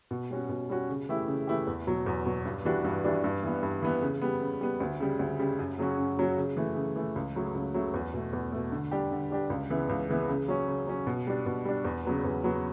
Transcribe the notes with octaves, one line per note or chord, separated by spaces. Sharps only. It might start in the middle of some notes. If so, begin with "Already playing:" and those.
B2
G3 C#4 F#4
B2
G3 C#4 F#4
C#3
E3 A3 E4 G4
C#3
E3 A3 E4 G4
E2
B2 F#3
E2
B2 F#3
G2
E3 G3 D4 F#4
G2
E3 G3 D4 F#4
G2
E3 B3
G2
E3 B3
C#3
G3 B3
C#3
G3 B3
D2
C#3 G3
D2
C#3 G3
F#2
C#3 F#3 C#4 F#4
F#2
C#3 F#3 C#4 F#4
C#3
E3 A3
C#3
E3 A3
C#2
C#3 F#3 A3
C#2
C#3 F#3 A3
E2
B2 A3
E2
B2 A3
D3
G3 D4 G4
D3
G3 D4 G4
C#2
C#3 E3 B3
C#2
C#3 E3 B3
C#3
F#3 C#4
C#3
F#3 C#4
B2
G3 D4
B2
G3 D4
E2
C#3 F#3 B3
E2
C#3 F#3 B3